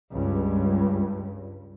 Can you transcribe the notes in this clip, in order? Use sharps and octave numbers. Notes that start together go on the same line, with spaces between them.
C#2 G2